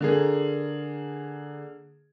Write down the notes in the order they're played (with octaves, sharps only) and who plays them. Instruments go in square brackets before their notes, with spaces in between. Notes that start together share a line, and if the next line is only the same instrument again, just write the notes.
[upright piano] D3 A#3 G#4